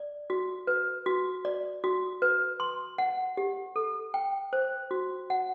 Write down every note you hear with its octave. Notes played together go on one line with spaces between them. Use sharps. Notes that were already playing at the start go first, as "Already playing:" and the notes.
Already playing: D5
F#4
B4
F#4
D5
F#4
B4
C6
F#5
G4
A4
G5
C5
F#4
F#5